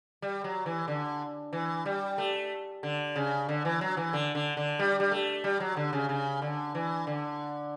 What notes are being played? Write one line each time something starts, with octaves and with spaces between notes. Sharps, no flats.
G3
F#3
E3
D3
E3
G3
A3
D3
C#3
D3
E3
F#3
E3
D3
D3
D3
G3
G3
A3
G3
F#3
D3
C#3
C#3
D3
E3
D3